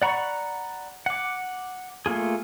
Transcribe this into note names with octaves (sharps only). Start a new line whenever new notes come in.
D5 F#5 A#5 B5 C#6
F#5 D6
A3 A#3 F4 G#4